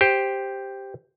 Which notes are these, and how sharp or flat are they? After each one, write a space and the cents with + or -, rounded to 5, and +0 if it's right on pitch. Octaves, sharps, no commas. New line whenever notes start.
G4 +0 C5 +0